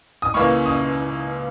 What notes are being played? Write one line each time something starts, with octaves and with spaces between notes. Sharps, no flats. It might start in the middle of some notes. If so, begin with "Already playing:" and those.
D#6
C#2 C#3 E3 A#3 C#6
D#6